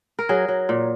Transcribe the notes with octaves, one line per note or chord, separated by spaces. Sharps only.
A#4
F#3 G#4
F#3
A#2